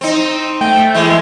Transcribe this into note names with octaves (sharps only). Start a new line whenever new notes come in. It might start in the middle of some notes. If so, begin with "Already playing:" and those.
C4 D#4
A3 G5
E3 G#3 E5